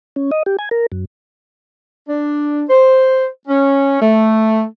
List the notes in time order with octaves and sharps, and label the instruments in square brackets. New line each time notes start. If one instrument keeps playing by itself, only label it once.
[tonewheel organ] C#4
D#5
G4
G#5
A#4
F#2
[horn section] D4
C5
C#4
A3